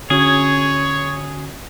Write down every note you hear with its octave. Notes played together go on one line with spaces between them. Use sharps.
D3 C#4 F#4 G#4 C#5